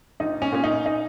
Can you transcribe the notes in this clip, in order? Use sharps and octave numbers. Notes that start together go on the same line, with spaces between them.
A#1 D#4
C#4
A#2 C#4
D#4
D#4